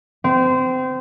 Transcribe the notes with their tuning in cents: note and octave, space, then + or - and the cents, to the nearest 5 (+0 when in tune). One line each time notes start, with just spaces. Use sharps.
C4 -25